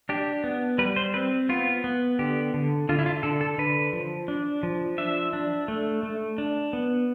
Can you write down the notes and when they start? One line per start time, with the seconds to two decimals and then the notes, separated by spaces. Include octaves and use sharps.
0.09 D4 G4
0.44 B3
0.78 G3 B4
0.96 C5
1.14 C4 B4
1.49 B3 F4
1.84 B3
2.19 D3 G4
2.54 D3
2.89 D3 F4
2.99 E4
3.06 F4
3.23 D3 A4
3.41 A4
3.58 D3 B4
3.93 F3
4.28 D4
4.63 F3
4.98 D4 E5
5.33 D4
5.68 A3
6.03 A3
6.38 D4
6.73 B3